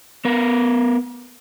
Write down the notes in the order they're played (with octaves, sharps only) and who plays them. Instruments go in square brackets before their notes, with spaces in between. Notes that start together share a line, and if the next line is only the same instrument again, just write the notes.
[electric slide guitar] B3 A#4